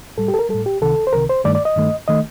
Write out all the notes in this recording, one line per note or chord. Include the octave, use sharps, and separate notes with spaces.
A2 G3 A4
G4
A4
A#4
A2 G3 A4
G4
C2 C3 D#3 A4
C5
C2 C3 D#3 A#4
C5
G2 D#3 A3 D5
D5
D#5
G2 D#3 A3
D#3 A3 D#5